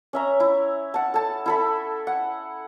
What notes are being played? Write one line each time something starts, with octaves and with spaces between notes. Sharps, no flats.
C#4 E5 A#5
E4
F#5 A5
A4 A5
E4 A4 B5
F#5